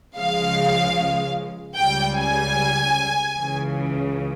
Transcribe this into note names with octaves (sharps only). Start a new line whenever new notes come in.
C#2 C#3 F3 G#3 F5
C#2 C#3 G3 G5
G#5
C#2 C#3 E3